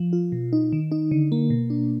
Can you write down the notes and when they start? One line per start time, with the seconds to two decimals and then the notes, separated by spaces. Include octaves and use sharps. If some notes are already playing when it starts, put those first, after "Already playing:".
Already playing: F3
0.13 F4
0.32 B2
0.53 D#4
0.73 D#3
0.92 D#4
1.11 D3
1.32 A#3
1.50 B2
1.70 D4